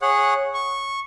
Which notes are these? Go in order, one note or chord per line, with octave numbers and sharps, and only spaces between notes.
G#4 C#5 F#5 F#6
C#6